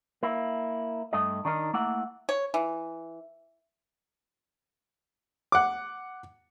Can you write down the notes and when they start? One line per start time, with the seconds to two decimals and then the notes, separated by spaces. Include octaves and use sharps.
0.23 A#3 E4
1.13 G2 A3 D#5
1.45 D#3 D4 D#4 A#4
1.73 A3 A#3 E4 F#5
2.29 C#5
2.54 E3
5.52 F#5 D6